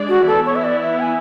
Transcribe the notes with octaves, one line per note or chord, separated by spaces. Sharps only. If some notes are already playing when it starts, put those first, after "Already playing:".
Already playing: G#3 D4 G#4 D5
F#4
E3 B3 E4 A4
C#5
E5
D5
E5
G#5